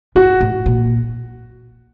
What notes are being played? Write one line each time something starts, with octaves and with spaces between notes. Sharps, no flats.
G#2 F#4
A2
A#2